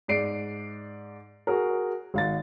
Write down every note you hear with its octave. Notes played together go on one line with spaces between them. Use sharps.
G#2 D5 C7 D7
F#4 G#4 A#4
G#1 F5 A6